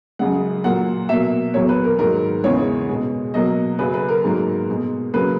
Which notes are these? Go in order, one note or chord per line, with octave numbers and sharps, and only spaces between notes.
F#2 C#3 G#3 F#5
A#2 F#3 A#3 F#5
B2 F#3 A#3 E5
E2 B2 F#3 A#3 C#5
B4
A#4
G#2 D#3 F#3 A#4
E2 C#3 E3 G#3 C#5
B2 G#3
B2 F#3 A#3 D#5
F#2 C#3 F#3 B4
B4
A#4
G#2 F#3 A#3
B2 G#3
C#3 F#3 A#3 B4